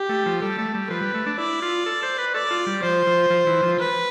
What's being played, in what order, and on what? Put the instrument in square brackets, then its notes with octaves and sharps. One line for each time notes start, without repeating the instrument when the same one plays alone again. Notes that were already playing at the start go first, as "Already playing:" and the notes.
Already playing: [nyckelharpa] G4
[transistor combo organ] A3
F3
[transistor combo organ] G3 [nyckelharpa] A4
[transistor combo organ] A3
G3
[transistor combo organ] F3 [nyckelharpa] B4
[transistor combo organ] G3
A3
D4
[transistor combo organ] E4 [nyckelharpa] D5
[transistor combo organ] F4
A4
C5
B4
[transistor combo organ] A4 [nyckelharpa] D5
[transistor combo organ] F4
G3
[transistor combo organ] F3 [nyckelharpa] C5
[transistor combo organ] F3
F3
E3
F3
[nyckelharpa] B4